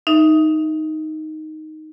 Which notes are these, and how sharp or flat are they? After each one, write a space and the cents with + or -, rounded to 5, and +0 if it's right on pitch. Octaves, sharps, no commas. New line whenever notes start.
D#4 +0 E5 +0